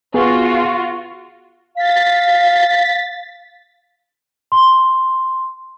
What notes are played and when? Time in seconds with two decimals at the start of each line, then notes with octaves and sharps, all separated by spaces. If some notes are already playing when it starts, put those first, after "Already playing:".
0.14 B3 F4 F#4 G#4
1.76 F5 A6 B6
4.52 C6